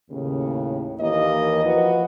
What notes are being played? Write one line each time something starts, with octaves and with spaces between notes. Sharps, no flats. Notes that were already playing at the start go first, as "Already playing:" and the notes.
D#2 A2 C#3
D#2 E3 A#3 D#5
F3 F#4 B4